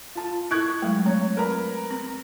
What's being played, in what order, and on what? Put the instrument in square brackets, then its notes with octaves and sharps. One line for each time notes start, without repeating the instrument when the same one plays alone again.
[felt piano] F4 A5
[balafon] E4 [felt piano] C#6 F#6 G#6
[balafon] F#3 G#3 A3
[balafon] C4 [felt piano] C#5
[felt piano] A#4 B4 A#5
[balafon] C4